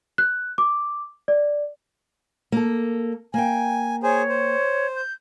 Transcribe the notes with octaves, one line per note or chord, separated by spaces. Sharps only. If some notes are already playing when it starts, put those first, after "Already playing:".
F#6
D6
D5
A#3 A4
A#3 G5 G#5
G#4 C5 C#5 G#5
C5
G6